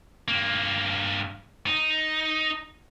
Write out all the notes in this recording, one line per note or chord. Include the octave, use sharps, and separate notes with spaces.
G2 A#3
D#4